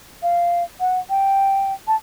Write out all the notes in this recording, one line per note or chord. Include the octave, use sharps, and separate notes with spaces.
F5
F#5
G5
A5